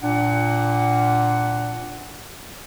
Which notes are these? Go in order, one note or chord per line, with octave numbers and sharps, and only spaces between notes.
A#2 D4 F#5